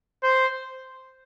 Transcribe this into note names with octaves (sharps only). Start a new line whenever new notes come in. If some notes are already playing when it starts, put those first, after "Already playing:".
C5